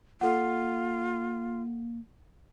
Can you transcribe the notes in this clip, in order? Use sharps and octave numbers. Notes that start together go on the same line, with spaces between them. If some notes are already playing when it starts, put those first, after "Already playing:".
A#3 F4 A4 F#5